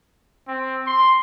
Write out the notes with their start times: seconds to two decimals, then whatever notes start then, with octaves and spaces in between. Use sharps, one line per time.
0.48 C4
0.87 C6